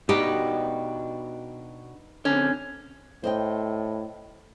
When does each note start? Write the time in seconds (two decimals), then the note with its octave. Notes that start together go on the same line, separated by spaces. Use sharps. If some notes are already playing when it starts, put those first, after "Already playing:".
0.09 B2 D4 D#4 F#4 G4 B4 D#5
2.25 D3 C4 C#4
3.24 A2 C5 D#5 G5